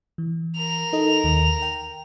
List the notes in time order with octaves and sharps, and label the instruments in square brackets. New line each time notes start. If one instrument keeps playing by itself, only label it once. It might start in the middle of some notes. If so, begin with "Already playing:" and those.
[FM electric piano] E3
[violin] A#4 F7
[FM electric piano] D#4 A4 D#5
D#2 D#3
G5